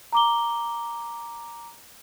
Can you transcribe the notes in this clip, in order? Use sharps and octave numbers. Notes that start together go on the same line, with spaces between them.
A#5 D6 G7